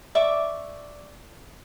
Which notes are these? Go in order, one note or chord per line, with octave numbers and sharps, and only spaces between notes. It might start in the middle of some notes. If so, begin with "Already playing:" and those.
D5 E5 C#6 D6